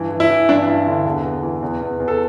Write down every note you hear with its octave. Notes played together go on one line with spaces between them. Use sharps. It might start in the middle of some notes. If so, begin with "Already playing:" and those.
Already playing: G2 E3
E3
E4
E3
G2 D4
G2 E4
D3
E2
E2
E3
E2
E2
E2
A4